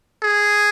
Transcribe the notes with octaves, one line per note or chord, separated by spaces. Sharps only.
G#4